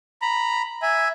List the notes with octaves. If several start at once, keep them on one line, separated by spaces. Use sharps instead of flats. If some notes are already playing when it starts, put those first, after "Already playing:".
A#5 B5
E5 G#5